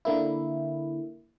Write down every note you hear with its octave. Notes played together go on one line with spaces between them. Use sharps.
D3 A#3 E4